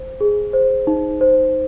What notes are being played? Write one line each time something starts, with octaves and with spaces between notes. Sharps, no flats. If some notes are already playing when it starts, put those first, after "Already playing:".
Already playing: C5
G#4
C5
D#4
C5